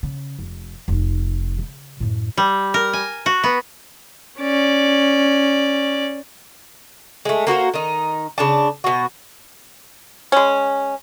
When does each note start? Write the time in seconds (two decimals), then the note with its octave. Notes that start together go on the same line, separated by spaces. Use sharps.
0.03 C#3
0.39 F1
0.88 F1 D#4
1.59 C#3
2.00 F#2 A2
2.37 G3
2.74 A#4
2.93 G#5
3.26 F#4
3.44 B3
4.39 C#4 D5
7.25 G#3 A3
7.47 A#3 F#4 B4 C5
7.74 D#3 D#4
8.38 C#3 D4 A5
8.84 B2 F#4
10.32 G#3 C#4